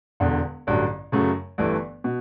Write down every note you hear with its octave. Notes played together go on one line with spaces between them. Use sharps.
E1 E2 D3
A1 G2 D3 F#3
F#2 C#3 F#3 A3
G1 G2 E3 A3
B2